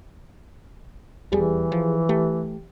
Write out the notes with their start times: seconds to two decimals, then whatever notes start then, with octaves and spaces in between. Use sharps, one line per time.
1.32 D#1 E2 E3 G3 G4 G#4
1.72 F3
2.09 A3 G4